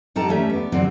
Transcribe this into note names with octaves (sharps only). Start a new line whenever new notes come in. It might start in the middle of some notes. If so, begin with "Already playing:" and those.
G#2 G3 A4 A5 A#5
E2 G3 A3 C#4 E5
B3 D5
D3 F#3 G3 C4 D4